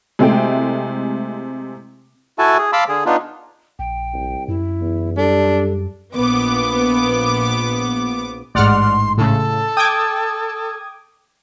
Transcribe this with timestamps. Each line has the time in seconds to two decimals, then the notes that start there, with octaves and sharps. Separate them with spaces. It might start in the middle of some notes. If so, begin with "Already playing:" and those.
0.19 C3 G#3 A3 E4 G5
2.39 E4 F#4 A4 G#5 A5
2.58 G#4
2.73 F5 A5 B5 C6 D6 E6
2.88 D3 G#4
3.06 B3 D4 D#4 F4
3.79 A#1 G5
4.14 C2
4.48 F#2 E4
4.80 E2
5.17 G3 D4 A4
6.15 A#1 B3 D6
8.55 A1 G#2 D5 F#5 C6 F6
9.17 A2 C#3 A4
9.77 G5 D6 D#6 G#6